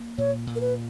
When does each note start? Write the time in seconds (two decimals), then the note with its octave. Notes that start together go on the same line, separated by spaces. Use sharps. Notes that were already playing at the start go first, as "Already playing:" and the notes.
Already playing: A#3
0.18 A#2 C#5
0.47 A#2
0.56 A#4
0.61 B4